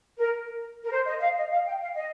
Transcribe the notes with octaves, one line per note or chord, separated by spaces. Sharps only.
A#4
A#4
C5
D#5
F5
D#5
F5
G5
F5
D#5